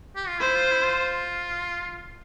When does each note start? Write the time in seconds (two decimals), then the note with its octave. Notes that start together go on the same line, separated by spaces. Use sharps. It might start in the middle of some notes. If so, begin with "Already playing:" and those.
0.16 G4
0.28 F4
0.40 E4 C5
0.55 F4
0.71 E4
0.84 F4